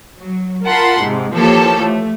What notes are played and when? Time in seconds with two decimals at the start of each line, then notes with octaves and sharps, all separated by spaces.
0.19 F#3
0.66 F4 A#4 F#5 A5 B5 C6
1.01 G#2 C3
1.36 E3 F3 A#3 G4 A4 C#5
1.82 A3